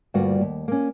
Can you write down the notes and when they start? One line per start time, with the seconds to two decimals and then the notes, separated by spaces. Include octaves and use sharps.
0.14 D2 G2 G3 A#3 F4 F#4
0.41 D#2
0.68 A#3 C#4